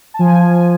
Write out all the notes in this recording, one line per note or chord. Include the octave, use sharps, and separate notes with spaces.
A5
F3 G#5